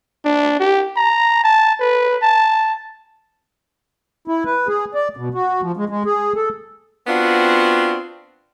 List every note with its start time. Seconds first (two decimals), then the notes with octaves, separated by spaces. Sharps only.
0.25 D4
0.60 G4
0.96 A#5
1.44 A5
1.80 B4
2.22 A5
4.28 E4
4.45 B4
4.68 G#4
4.94 D5
5.17 B2
5.34 F#4
5.62 F3
5.77 G#3
5.89 G#3
6.06 G#4
6.36 A4
7.07 B3 C4 D4 F4 F#4